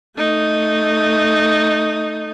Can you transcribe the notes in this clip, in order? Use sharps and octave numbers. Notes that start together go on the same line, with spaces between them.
A3 D#4